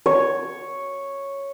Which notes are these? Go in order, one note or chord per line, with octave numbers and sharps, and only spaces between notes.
C#5